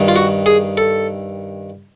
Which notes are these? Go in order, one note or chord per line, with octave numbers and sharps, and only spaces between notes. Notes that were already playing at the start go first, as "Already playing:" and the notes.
Already playing: G2 D#3
F4
F#4
G#4
A4